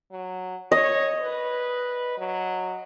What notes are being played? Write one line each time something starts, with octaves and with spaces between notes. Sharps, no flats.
F#3
C#5 D#5
B4
F#3